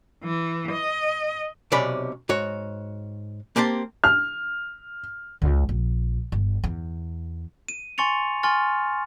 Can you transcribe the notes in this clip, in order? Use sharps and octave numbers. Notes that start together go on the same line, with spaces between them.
E3
D#5
B1 C3 C#4 D5 B5
G#2 F#4 C#5
A#3 C4 G4 C5 A5
F6
C#2
A#1
G1
E2
D#7
G#5 C6 C#6 A6 C#7 F7
G#5 C6 C#6 F6 A6